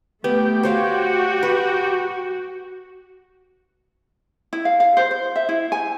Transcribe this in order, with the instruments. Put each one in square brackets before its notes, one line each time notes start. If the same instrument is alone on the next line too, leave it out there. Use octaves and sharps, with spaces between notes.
[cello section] A3 [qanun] B3 [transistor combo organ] G4
[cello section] F#4 [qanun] C5 C#5 F5
[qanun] B4
[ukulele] E4
F5
F5
C5
C5
E5
E4
G#5